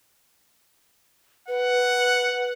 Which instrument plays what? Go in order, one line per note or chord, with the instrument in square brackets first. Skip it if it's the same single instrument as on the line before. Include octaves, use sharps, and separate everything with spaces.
[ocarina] B4 [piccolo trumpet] F#5